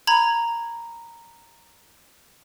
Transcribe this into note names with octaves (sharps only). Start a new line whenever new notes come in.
A#5 B5 G#6